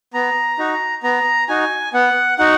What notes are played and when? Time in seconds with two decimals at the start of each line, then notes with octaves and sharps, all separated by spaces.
0.14 B3 A#5
0.58 D#4 F#4
1.03 B3 A#5
1.49 D#4 F#4 G#5
1.93 B3 F#5
2.38 D#4 F#4 F#5